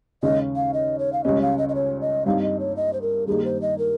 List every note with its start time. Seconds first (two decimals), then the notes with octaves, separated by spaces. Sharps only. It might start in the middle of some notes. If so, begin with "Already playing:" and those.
0.23 D#2 C#3 G#3 C#4 D#5
0.56 F5
0.74 D#5
0.99 C#5
1.13 F5
1.24 C#2 C#3 G3 C#4 D#5
1.42 F5
1.58 D#5
1.69 D#5
1.75 C#5
2.01 D#5
2.26 G2 G3 C4 D#4 F5
2.42 D#5
2.60 C#5
2.77 D#5
2.93 C5
3.02 A#4
3.27 G2 D#3 G3 A#3 D#4 G#4
3.45 C5
3.62 D#5
3.78 A#4